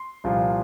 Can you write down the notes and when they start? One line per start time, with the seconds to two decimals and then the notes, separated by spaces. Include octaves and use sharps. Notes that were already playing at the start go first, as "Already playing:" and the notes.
Already playing: C6
0.24 C2 A#2 F3